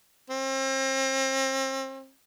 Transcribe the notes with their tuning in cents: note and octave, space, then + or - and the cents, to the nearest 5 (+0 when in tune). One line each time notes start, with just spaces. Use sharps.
C4 +35